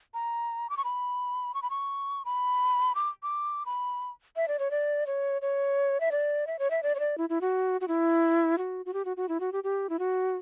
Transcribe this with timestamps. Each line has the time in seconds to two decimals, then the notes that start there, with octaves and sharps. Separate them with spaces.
0.14 A#5
0.70 D6
0.77 C#6
0.84 B5
1.54 C#6
1.62 B5
1.70 C#6
2.25 B5
2.95 D6
3.23 D6
3.66 B5
4.36 E5
4.48 D5
4.59 C#5
4.71 D5
5.07 C#5
5.42 C#5
6.00 E5
6.12 D5
6.47 E5
6.59 C#5
6.70 E5
6.83 D5
6.95 C#5
6.99 D5
7.18 E4
7.30 E4
7.41 F#4
7.81 F#4
7.88 E4
8.58 F#4
8.86 F#4
8.94 G4
9.05 F#4
9.17 F#4
9.29 E4
9.40 F#4
9.52 G4
9.64 G4
9.89 E4
9.99 F#4